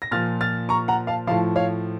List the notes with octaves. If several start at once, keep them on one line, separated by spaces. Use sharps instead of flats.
A#6
A#2 F3 F6 A6
F6 A6
A#5 C#6
F#5 A#5
F5 A5
A2 F3 F5 A5
C#5 F5